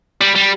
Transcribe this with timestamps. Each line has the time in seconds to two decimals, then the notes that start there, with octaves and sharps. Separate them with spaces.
0.21 G3
0.35 G3